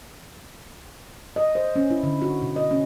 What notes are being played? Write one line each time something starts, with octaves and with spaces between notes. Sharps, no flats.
D#5
C5
C#4
E4
D3
F#4
B2
D#5
C#4